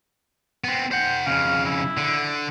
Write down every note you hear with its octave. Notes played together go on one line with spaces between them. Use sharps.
B3 C4
C5 F#5 G5
F2 C#3 F5
E4
D3